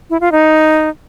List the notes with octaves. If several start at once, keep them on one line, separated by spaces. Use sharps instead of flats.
E4
F4
D#4